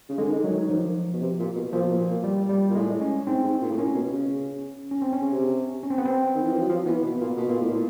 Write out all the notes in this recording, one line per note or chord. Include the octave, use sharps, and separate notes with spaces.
C#3
D3 G#3
D#3
D3
F#3
D#3
D#3 F3
B2
C3
A#2
B2
A#2 F3
B2
A#2
G3
G3
A#2
A2 G#3
C#4
G#2 C4
G#2
A#2
A2
A#2 C#4
B2
C#3
C#4
C4
C#4
C#3
C3
C#4
C4
B3
C4
D#3
E3
F3
F#3
F3
E3 B3
B2
A#2
B2
A#2
A2
A#2